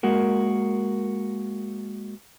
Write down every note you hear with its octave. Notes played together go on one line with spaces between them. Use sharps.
G#3 A#3 F#4 A#4